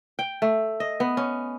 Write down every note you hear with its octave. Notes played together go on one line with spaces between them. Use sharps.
G5
A3
D#5
B3
C#4